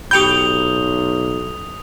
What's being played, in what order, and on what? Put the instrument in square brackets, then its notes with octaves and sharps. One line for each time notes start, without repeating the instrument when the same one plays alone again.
[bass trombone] B1 [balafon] G4 G5 B5 [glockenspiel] D#6 F7 G7 [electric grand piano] G6